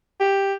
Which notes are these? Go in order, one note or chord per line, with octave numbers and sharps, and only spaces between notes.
G4